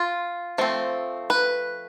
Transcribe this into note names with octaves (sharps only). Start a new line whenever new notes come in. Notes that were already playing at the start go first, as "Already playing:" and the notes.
Already playing: F4
F3 A3 C4
B4